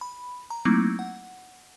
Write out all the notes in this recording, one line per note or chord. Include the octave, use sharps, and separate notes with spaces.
B5
A#5
F#3 A3 A#3 C4 D#4 E4
F#5